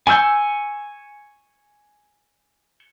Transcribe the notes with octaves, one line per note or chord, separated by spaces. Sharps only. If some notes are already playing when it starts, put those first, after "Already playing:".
G#5 C#6 E6 G6